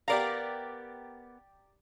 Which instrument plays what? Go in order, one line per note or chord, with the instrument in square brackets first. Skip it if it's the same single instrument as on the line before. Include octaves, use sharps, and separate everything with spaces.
[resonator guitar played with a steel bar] B3 A#4 F5 [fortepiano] G4 D5 A#5